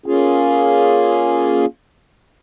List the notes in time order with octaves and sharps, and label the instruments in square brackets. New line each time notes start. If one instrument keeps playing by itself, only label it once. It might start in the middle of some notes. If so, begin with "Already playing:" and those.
[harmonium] A#3 C#4 F4 G#4